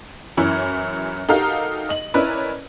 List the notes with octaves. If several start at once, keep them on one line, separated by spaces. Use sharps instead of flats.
F#2 E3 C#4 E4
D#4 F#4 G4 A4 A#4 F5
D#5 F#7
C#4 E4 A#4 B4 D5 D#5